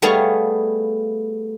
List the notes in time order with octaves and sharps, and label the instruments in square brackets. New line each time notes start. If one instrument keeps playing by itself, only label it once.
[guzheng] G3 A3 B3 G#4 C#5 F5